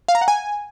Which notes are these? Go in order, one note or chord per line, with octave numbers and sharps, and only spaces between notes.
F5
A#5
F#5
G#5